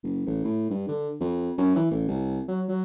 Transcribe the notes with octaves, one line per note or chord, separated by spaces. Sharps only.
F#1
A1
A2
G2
D3
F2
F#2
E3
A1
C2
F#3
F#3